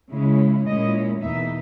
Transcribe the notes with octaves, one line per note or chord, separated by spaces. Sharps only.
C#3 G#3 C#4 E4
A#2 G#3 C#4 E4 D#5
E2 B2 A#3 D#4 E5